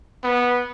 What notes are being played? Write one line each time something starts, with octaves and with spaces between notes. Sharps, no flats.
B3